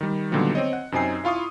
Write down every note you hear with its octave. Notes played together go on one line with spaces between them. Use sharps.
D#3 G3
A#2 D3 D#3 F#3 G3 B3
C4 C#5 D#5
F#5
F#2 C3 C4 D#4 G#5 C7
E4 F4 F5 C#6 D#6